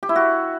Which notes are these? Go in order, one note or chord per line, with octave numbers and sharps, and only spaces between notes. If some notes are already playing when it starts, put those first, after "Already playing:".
G4
E4
F#4